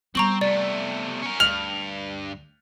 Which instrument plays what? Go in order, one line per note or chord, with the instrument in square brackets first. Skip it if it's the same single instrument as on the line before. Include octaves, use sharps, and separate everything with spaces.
[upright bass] G3 B3 [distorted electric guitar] C4 [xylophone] A#5 C#6 F#7
[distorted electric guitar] C3 A3 [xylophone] D5
[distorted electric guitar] C#4 A#4
[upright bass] D2 [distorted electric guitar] G2 [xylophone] F6 F#7 [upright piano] F7